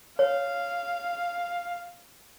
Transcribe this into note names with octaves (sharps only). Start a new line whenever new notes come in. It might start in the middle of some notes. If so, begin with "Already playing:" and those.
C#5 F5